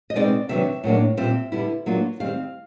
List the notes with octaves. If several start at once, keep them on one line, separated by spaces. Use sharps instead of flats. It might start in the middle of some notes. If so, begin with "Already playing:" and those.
D#5
B2 G#3 C4 D#4 D5
C3 D#3 F#3 B3 D4 E5
A2 F#3 A#3 D4
A#2 G3 C4 F4 E5
D3 G3 B3 E4
F#3 A#3 D4 F4
D#3 G3 C4 F5